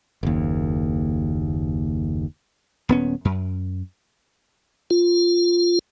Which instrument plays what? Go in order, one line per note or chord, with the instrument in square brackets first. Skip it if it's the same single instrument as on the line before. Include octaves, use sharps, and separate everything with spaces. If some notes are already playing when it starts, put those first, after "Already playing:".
[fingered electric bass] F#1 D#2
[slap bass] D#1 B3 C#4
F#2
[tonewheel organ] F4